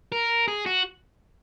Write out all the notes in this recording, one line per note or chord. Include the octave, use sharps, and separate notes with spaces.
A#4
G#4
F#4